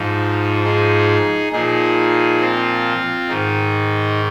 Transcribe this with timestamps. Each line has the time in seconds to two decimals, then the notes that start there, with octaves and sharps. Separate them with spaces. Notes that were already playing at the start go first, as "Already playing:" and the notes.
Already playing: G#2 F3 D#4
0.64 D#4 G#4
1.52 A#2 F3 D#4 G#4
2.41 C4 F4
3.29 G#2 D#3 D#4